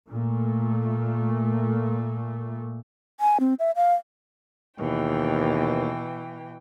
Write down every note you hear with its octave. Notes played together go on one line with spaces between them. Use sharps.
A#2 A3
G#5
C4
E5
F5
D#2 B2 E3 G5